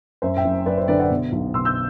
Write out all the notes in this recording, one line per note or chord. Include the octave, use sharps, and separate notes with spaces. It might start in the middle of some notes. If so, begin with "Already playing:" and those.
F#2 C5 E5
E5 G5
F#1
F#1 B4 D5
C5
D3 B4 D5
D5 F#5
B2
B1
B2 C6 E6
E6 G6